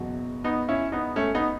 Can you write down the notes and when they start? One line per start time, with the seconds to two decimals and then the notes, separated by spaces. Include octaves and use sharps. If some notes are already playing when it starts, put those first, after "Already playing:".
Already playing: F#1 E2 B2 F#3
0.44 B3 D#4
0.69 C#4 E4
0.92 B3 D#4
1.16 A3 C#4
1.35 B3 D#4